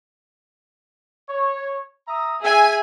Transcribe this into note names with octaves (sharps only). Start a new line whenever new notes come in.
C#5
E5 A#5 D#6
G#4 E5 G#5